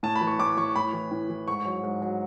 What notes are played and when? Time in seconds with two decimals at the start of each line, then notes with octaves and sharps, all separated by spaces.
0.03 A2 A5
0.16 B5
0.21 E3
0.27 C#6
0.39 A2 D6
0.57 E3 C#6
0.76 A2 B5
0.93 E3
1.11 A2
1.29 E3
1.48 G#2 C#6
1.65 F#3
1.83 G#2
2.02 F#3